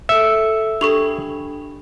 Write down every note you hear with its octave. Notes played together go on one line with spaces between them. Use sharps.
A4 E5 C#7
D4 G4 A4 B5 C#6 F7